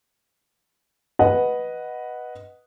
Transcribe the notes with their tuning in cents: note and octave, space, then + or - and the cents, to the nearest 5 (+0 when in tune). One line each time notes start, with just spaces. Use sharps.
B4 -5 D#5 +0 F#5 +0